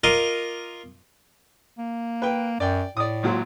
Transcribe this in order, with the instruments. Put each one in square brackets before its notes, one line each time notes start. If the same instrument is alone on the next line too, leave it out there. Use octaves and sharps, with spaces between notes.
[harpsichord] F4 A#4 D#5 D6
[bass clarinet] A#3
[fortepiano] B4 G5
[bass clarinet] F#2 [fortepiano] D5 G5
[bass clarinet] A2 [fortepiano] D5 D#6
[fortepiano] G#1 A#2 F#3